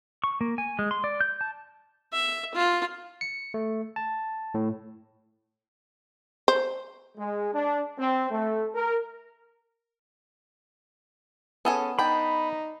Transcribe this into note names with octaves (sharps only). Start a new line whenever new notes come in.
C#6
A#3
G#5
G#3
C6
D5
G6
A5
E5
F4
C#7
A3
A5
A2
C5
G#3
D4
C4
A3
A#4
B3 C#4 G#4 A4 G#5
D4 D#4 G5 B5